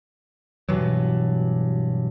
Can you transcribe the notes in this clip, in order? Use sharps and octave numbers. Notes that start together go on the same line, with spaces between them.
G2 B2 E3 F#3